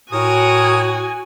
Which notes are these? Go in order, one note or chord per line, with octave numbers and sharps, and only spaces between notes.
A2 F#4 A#4 C#5 G#5 D#6